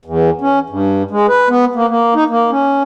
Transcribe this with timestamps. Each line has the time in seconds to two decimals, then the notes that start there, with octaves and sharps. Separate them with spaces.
0.05 E2
0.41 C#4
0.70 G2
1.11 G#3
1.28 B4
1.49 B3
1.75 A#3
1.89 A#3
2.15 D#4
2.30 A#3
2.51 C#4